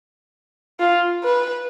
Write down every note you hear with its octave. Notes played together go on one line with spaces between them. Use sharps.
F4
B4